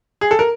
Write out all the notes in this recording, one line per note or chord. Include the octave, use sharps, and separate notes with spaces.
G#4
A4
A#4